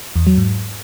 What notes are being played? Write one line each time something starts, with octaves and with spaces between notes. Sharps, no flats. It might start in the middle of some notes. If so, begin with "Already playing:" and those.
E2
F#3
G#2